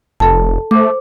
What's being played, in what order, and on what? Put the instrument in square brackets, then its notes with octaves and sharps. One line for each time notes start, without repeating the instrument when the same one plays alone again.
[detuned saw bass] F1 [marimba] A4 A5
[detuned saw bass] A3 [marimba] C5 D6